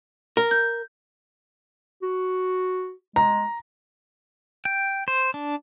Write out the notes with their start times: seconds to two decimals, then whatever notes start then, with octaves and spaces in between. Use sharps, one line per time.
0.37 A#4
0.51 G6
2.03 F#4
3.16 G#3 A#5
4.65 G5
5.08 C5
5.34 D4